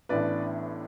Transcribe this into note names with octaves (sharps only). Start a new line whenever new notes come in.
A1 A2 E3 B3 D4 B4 D5